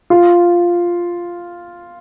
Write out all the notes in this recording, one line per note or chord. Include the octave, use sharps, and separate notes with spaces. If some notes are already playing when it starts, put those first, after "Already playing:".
F4